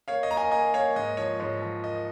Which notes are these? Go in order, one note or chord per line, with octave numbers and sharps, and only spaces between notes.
A#3 C#5 F5
D#5
A#3 A#5
D#5 G#5
A#3 D#5 G#5
A#3 C#5 F5
G#2 D#5
F3 C#5
G#2 C#5
F3
A#3 D#5